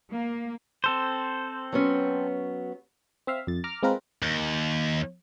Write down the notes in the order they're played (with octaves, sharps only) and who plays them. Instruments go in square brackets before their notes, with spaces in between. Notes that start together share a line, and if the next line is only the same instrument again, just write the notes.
[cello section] A#3
[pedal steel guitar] C4 A4 C5
[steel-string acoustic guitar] F#3 B3 C#4
[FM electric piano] C4 E5 F5
F2 A6
A#5 D6 F6
G#3 C4 F4 A#4 B4
[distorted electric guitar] D#2